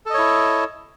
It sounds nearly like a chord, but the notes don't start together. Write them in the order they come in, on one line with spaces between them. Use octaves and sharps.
A4 D#5 C#5 E4